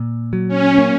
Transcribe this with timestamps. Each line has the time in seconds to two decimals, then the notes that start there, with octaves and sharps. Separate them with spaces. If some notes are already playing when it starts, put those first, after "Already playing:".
Already playing: A#2
0.33 F#3
0.48 C#4
0.78 A#3